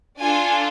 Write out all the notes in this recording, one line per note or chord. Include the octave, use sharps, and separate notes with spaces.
D4 F4 A4 G#5